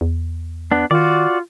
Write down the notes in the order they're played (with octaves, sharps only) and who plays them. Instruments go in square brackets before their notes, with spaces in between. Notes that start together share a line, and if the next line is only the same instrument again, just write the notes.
[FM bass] E2
[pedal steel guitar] B3 D4
[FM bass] D#3 [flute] F4 [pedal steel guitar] F#4 D5